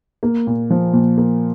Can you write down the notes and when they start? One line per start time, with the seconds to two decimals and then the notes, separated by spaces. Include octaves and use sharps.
0.23 A#3
0.47 A#2
0.70 F3
0.93 A#2
1.17 A#3